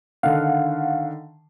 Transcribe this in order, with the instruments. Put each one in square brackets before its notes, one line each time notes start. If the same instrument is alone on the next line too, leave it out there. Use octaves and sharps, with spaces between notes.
[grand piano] D3 D#3 [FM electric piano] F5 F#5